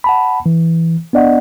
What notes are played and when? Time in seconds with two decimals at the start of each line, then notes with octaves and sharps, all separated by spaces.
0.04 F#5 A5 B5
0.46 E3
1.13 B3 D4 D5 D#5 F#5